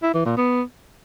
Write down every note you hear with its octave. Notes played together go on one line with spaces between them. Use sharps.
E4
E3
A#2
B3